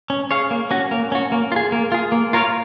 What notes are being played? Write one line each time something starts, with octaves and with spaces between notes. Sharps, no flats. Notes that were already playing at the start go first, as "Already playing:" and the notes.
C#4
G#4 C#5 F5
A#3
C#4 F#4
A#3
C#4 F#4
A#3
F4
G#4
A#3
F4 G#4
A#3
F4 A#4 C#5 F5